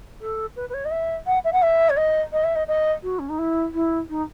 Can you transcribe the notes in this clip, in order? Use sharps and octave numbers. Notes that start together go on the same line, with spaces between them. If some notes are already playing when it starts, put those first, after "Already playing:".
A4
B4
B4
C#5
D#5
E5
F#5
E5
F#5
E5
C#5
D#5
D#5
E5
D#5
D#5
F#4
C#4
D#4
E4
E4
D#4